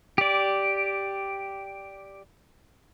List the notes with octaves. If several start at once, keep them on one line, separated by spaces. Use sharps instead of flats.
G4 D5